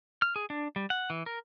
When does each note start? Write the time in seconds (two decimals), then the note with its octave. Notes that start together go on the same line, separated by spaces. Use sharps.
0.22 F6
0.36 G#4
0.50 D4
0.76 G3
0.90 F#5
1.10 E3
1.26 A#4